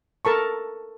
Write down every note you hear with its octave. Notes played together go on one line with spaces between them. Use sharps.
A4 A#4 A5 C#6